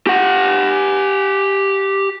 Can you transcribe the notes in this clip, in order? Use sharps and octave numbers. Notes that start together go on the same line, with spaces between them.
G4 F#5